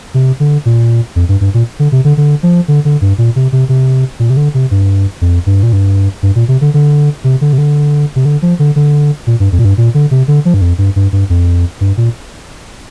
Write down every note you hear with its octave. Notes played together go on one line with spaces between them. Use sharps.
C3
D3
A#2
F2
G2
G2
A#2
D3
C3
D3
D3
F3
D3
D3
G2
A#2
C3
C3
C3
A#2
C3
D3
C3
G2
F2
G2
A#2
G2
G2
A#2
C3
D3
D3
C3
D3
C3
D3
C3
D3
F3
D3
D3
A#2
G2
F2
A#2
G2
A#2
D3
C3
D3
F3
G2
F2
G2
G2
G2
F2
G2
A#2